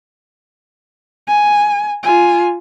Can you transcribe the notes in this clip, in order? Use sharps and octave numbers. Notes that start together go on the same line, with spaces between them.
G#5
F4 G#5